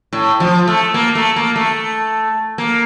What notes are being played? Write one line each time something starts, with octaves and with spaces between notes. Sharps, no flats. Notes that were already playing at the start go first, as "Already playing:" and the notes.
A2
F3
A3
A#3
A3
A#3
A3
A#3